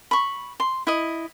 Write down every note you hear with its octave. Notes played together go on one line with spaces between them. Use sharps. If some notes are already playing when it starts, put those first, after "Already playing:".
B5 C#6
C6
E4 D#5